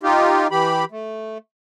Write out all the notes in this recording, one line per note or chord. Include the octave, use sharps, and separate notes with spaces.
D#4 F4 G4
E3 G4 B5
A3